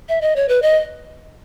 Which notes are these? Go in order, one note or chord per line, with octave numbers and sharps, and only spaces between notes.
E5
D#5
C#5
B4
D#5